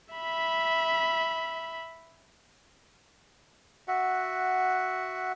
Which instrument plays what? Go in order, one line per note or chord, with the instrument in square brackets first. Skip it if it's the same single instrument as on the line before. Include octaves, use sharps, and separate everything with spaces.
[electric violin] E5 B5
[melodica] F#4 E5 F#5